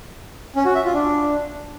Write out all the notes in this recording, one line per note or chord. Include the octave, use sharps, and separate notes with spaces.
C#4
F#4
E5
F4
D4